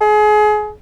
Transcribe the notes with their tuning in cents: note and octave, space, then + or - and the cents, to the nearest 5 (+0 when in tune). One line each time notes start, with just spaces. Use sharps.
G#4 +30